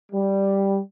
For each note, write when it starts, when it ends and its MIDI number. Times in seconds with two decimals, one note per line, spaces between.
0.12 0.78 55